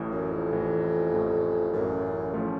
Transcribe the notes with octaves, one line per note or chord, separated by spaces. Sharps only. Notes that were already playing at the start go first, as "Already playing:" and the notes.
Already playing: A1 A2 E3
F#2
F2
A1 A2 E3
A1 A2 E3
A1 F#2 A2 E3
A2 F3 A3 C#4 F4